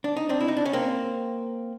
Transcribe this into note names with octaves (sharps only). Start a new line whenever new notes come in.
D4
D#4
C4 D4
E4
D#4
D4
C#4
A#3 C4